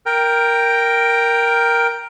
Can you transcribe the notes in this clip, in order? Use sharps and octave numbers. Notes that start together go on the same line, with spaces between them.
A#4 G5